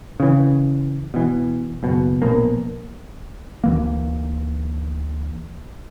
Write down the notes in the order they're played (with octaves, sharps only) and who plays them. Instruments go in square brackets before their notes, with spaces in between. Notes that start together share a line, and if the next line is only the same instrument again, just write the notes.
[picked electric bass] C#3 E3
B2 E3
F#1 B2
A#1 B2 A#3
D2 E3 A#3